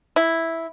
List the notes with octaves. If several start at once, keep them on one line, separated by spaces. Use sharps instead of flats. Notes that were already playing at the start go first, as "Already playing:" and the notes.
E4